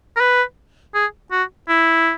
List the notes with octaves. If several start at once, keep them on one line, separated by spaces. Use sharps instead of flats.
A#4
B4
G#4
F#4
E4